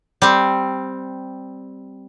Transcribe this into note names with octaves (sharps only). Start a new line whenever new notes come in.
G3 C4